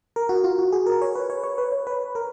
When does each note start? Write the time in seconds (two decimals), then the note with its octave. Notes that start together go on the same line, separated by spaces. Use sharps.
0.16 A#4
0.29 F#4
0.44 F4
0.59 F#4
0.72 G#4
0.87 A#4
1.02 C#5
1.15 B4
1.30 C#5
1.44 C#5
1.58 B4
1.72 C#5
1.87 B4
2.15 A#4